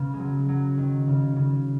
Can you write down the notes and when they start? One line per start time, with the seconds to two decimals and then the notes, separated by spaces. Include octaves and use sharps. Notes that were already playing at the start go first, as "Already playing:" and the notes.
Already playing: C#3 B3
0.14 G#3
0.19 F#3
0.48 F#3
0.77 D#3
1.08 C#3
1.36 C#3